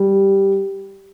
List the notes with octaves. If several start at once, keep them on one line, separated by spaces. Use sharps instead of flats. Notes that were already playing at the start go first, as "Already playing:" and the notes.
Already playing: G3